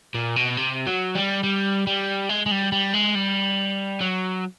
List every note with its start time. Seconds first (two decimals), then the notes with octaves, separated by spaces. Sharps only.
0.14 A#2
0.36 B2
0.57 C3
0.87 F#3
1.15 G3
1.43 G3
1.87 G3
2.29 G#3
2.46 G#3
2.51 G3
2.72 G3
2.94 G#3
3.15 G3
4.01 F#3